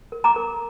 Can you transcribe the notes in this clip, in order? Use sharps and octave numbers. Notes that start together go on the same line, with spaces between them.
A#4
A#5 D6
A#4